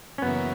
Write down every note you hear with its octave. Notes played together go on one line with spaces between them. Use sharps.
C#4
F#2 C#3 E3 A#3 B3